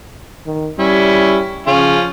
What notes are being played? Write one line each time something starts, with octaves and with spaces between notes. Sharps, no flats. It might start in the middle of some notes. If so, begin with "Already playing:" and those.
D#3
G3 C#4 E4
C#3 F3 C#4 F4